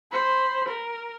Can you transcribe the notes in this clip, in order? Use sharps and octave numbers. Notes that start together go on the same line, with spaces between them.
C5 B5
A#4